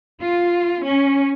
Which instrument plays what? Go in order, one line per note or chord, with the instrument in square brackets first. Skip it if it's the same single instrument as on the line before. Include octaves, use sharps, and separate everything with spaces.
[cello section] F4
C#4